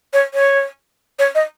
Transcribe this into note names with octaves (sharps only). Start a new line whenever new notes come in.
C#5
C#5
C#5
D#5